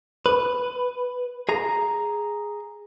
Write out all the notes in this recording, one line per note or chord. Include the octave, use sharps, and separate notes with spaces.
B4
G#4 A#5